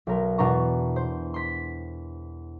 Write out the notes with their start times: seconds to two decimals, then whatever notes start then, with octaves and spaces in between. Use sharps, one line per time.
0.07 B1 A#4
0.38 E2 B2 D4 A#5 C#6
0.96 C5
1.34 C6 B6